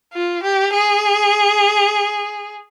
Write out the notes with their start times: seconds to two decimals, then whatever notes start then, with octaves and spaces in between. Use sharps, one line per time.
0.14 F4
0.43 G4
0.73 G#4